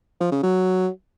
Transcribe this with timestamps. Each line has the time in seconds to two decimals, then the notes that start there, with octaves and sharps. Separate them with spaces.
0.20 F3
0.32 C#3
0.43 F#3